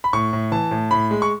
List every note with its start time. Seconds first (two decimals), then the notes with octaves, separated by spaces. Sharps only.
0.04 B5
0.13 A2 C#6
0.33 A2
0.52 E3 A5
0.71 A2
0.91 A2 B5
1.11 G#3
1.22 C#6